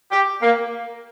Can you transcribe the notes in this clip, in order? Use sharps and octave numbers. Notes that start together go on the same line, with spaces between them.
G4
A#3